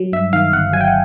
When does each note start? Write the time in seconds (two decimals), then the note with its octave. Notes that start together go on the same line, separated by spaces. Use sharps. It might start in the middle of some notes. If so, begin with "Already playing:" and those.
Already playing: F#3
0.12 G2 E5
0.33 D#3 F5
0.53 G1 F#5
0.73 F#3 G#5
0.81 G5
0.88 F#5